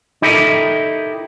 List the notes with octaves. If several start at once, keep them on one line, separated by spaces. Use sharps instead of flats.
D#4 E4 G4 A4 A#4 D#5